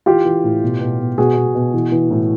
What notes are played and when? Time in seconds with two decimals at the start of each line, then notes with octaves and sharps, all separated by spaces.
0.06 E3 F4 G4
0.25 E3
0.44 A2
0.62 B2
0.81 B2
1.00 B2
1.18 B2 F#4 G#4
1.37 B2
1.55 B2
1.74 E3
1.92 E3
2.11 A2